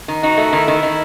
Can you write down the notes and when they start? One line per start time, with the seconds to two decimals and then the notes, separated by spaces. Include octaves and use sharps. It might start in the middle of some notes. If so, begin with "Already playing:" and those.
0.08 D#3
0.23 D#4 F#4
0.37 A3
0.53 D#3 E4
0.68 D#3
0.83 D#3